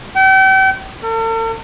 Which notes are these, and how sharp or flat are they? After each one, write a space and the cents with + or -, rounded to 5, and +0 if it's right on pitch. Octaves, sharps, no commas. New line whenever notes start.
G5 -40
A4 +45